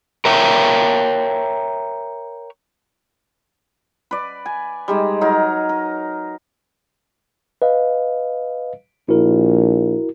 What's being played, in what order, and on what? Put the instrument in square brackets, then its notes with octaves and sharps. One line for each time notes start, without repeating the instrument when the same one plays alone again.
[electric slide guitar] A#4 C#5 E5 G5
[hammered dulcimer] B4 D5
G#5
G3 G#3 D#4
F#3 D#4 A#4 C#5
A#4
[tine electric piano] B4 D#5 F5
[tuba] A#1 [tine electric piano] E4 F#4 A#4